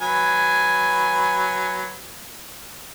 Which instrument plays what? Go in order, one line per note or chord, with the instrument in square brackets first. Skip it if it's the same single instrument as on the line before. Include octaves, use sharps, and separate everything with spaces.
[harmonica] F#3 B4 G#5